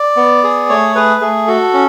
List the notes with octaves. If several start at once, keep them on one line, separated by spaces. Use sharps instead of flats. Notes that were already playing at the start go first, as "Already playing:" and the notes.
Already playing: D5
B3
G#4
A3 C#5
G#4 B4
A3 G#4
F#4 A4
C#4